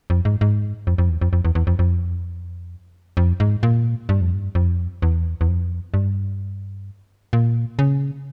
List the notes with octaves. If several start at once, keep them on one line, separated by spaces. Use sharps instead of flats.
F2
G#2
G#2
F2
F2
E2
F2
F2
E2
E2
F2
F2
F2
G#2
A#2
G2
F2
G2
F2
E2
E2
F2
G2
A#2
C#3